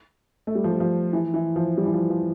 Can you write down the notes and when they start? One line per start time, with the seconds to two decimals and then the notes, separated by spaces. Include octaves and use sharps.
0.47 A3
0.55 G3
0.64 F3
0.71 G3
0.80 F3
1.13 E3
1.34 E3
1.56 F3
1.78 G3
1.85 E3
1.94 F3
2.10 F3